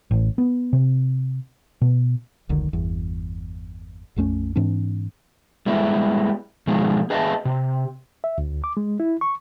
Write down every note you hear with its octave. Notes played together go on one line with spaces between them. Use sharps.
A1
B3
C3
B2
F1 C#2 D3 D#3
G1 E2
A#1 F2 A3 C#4
G#2 E3 C4 D4
G3 G#3 B3 E4
B2 D#3 F3 G#3
G#4 B4 D#5 E5 F#5 A5
C3
E5
D2
D6
G#3
E4
C#6